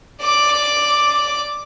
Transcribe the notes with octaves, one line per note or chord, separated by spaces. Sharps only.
D5 D6